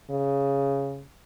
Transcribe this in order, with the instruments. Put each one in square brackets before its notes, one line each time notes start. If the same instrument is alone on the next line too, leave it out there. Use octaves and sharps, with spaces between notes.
[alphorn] C#3